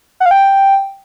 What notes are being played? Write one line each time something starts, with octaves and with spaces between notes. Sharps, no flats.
F#5
F5
G5